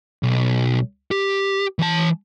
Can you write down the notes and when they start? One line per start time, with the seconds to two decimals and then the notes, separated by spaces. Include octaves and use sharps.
0.23 B1
1.11 G4
1.79 E3 A5